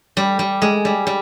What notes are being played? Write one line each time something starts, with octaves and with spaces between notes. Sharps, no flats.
G3
G3
G#3
G3
G3